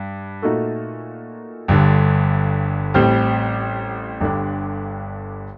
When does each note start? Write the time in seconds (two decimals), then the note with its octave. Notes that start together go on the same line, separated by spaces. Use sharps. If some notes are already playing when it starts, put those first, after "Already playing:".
Already playing: G2
0.42 A#2 A3 D#4 F#4 A4
1.68 G1 G2 D3
2.94 A1 A2 G3 C4 G4
4.20 G1 G2 D3 G3 D4